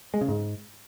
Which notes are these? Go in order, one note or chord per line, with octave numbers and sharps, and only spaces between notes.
G#3
C#3
G#2